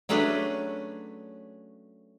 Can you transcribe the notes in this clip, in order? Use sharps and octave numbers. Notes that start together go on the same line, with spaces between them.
F#3 A3 C#4 D4 G#4 B4